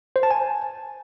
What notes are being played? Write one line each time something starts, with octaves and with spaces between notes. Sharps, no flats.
C5
A5
G#5